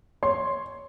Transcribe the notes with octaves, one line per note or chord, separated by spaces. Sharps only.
C#5 C6